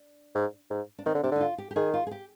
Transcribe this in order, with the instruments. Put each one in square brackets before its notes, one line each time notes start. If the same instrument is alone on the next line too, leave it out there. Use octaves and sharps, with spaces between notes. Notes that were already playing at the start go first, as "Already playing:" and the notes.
Already playing: [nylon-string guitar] D4
[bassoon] G#2
G#2
[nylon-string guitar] D4
[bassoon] D#3 [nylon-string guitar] C4
[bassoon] D3
[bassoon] C3 [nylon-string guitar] D4
[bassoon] D3 [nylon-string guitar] D#4
[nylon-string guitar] F4
G4
G4
[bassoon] D#3 [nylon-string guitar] G#4
[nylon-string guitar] F4
G#4
G4